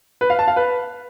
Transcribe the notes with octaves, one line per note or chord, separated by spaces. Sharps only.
B4
F5
A5
F5
B4